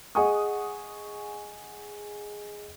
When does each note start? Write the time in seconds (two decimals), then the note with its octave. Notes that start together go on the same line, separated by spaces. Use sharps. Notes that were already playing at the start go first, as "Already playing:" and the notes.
0.15 G#4 D#5 F#5 G#5 C#6 D#6